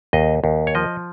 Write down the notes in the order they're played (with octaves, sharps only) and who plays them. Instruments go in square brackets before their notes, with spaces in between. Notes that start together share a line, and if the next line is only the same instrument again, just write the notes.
[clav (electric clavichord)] D#2 D#5
D#2
C#5
F3 D#5